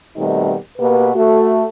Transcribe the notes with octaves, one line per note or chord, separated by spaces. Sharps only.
B2 D#3 G3 A3 C4 D#4
B2 A#3 G4 B4
A3 F#4